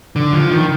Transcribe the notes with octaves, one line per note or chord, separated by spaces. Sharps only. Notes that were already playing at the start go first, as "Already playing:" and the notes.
D3
F3
D#3